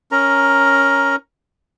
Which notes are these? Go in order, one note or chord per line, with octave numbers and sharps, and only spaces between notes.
C#4 A#4 A#5